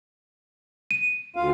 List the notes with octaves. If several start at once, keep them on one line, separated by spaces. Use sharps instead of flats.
D#7
D2 F4 F5